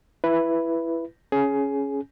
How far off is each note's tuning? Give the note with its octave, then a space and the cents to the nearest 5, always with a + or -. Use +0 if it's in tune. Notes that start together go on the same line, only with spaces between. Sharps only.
E4 +15 B4 +0
C#4 +0 G#4 +15